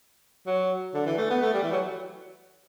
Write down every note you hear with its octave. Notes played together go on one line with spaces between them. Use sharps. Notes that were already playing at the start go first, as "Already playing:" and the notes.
F#3
D3
E3
A3
B3
A3
G3
E3
F#3